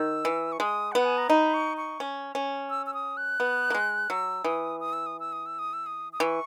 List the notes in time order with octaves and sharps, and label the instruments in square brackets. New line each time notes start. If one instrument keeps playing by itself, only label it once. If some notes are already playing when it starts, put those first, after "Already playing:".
Already playing: [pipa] D#3 [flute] E6
[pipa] E3
[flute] C#6
[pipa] G#3 [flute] D#6
[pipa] B3 [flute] F#5
[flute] G#5
A#5
[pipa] D#4 [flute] B5
[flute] C#6
C#6
[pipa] C#4
C#4
[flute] E6
E6
D#6
F#6
[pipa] B3
A#3
G#3
[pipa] F#3 [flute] E6
[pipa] E3 [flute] D#6
[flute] D#6
E6
D#6
E6
D#6
E6
D#6
E6
D#6
D#6
[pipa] E3 [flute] C#6